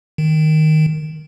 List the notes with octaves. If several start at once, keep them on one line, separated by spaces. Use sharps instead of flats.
D#3